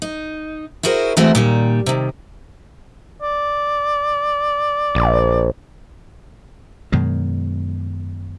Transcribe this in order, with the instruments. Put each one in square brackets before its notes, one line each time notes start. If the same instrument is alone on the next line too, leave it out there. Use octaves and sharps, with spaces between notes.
[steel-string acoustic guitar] D#4
E4 F#4 G#4 A#4 C5
E3 G#3 A3 C4 F#4
A#2 D#3 G3
C3 D#3
[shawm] D5
[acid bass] A#1
[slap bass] F#2 B2 D#3 G#3